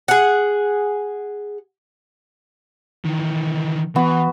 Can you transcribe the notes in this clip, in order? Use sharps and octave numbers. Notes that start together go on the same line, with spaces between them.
G#4 F#5
D#3 E3
E3 B3 F#4 G#5